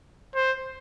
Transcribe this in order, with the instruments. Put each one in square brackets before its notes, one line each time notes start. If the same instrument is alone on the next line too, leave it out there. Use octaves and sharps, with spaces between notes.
[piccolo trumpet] C5